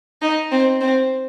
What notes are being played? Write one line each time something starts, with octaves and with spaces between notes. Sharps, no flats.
D#4
C4
C4